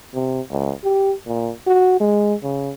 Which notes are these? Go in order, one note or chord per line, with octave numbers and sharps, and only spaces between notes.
C3
C#2
G4
A#2
F#4
G#3
C#3